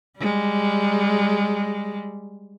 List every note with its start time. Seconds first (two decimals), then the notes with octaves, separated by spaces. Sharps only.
0.19 G3 G#3